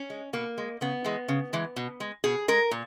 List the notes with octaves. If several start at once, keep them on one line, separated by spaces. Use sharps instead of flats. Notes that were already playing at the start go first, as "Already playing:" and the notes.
Already playing: C#4
G#3
B2 A#3
G#3
C#3 B3
E3 G#3
C#3
E3 G#3
B2
G#3
B2 G#4
G#3 A#4
A#2